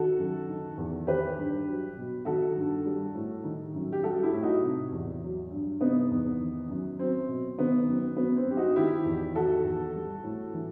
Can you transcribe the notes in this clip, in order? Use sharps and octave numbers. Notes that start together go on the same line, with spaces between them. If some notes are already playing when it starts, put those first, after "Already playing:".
Already playing: D#3 F#4 A4
F#2
D#3
E2
D#3 G4 B4
G2
F#3
B2
D#3 F#4 A4
G2
G3
A2
D#3
F#2
G4
G3 F#4 A4
E4 G4
A2
D#4 F#4
C3
E2
F#3
G2
C3 B3 D#4
E2
D#3
F#2
F#3 C4
B2
D#3 B3
F#2
F#3 B3
C4
G2 G4
D#4 F#4
D#3 E4 G4
E2
D#3 F#4 A4
E2
G3
A2
E3